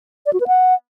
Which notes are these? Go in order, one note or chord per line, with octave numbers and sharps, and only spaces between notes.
D5
F#4
B4
F#5